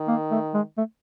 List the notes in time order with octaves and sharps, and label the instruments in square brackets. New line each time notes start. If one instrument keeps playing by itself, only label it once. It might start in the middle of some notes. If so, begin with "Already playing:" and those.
Already playing: [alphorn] D#3
[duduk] A#3
A3
G#3
A3